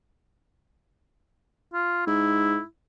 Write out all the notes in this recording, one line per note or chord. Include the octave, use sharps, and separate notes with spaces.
F4
G#2 E4